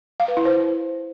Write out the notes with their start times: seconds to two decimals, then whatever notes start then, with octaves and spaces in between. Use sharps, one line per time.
0.20 F5
0.28 B4
0.37 E4
0.45 C5